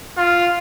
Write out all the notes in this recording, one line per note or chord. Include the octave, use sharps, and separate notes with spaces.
F4